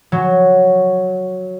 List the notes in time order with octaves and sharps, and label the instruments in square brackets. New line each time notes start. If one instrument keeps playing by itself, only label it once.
[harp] F#3